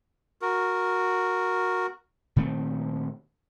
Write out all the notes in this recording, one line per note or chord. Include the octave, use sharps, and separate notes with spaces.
F#4 A#4
A#2 D#3 A3 C4